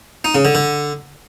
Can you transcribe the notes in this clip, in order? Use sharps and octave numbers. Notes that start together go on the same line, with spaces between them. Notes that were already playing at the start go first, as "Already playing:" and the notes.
D#4
C#3
D3
D3